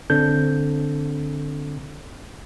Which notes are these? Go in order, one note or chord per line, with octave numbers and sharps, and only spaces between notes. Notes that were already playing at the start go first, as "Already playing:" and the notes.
D3 C4 D4 A4 G6